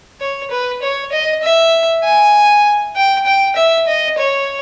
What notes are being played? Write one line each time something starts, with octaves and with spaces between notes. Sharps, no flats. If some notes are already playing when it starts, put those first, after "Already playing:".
C#5
B4
C#5
D#5
E5
G#5
G5
G5
E5
D#5
C#5